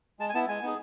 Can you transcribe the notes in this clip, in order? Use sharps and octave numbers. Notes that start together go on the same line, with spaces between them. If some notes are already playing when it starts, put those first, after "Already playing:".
G#3 A5
G#5
B3 E4 A5
G#3 G#5
B3 D#4 G#4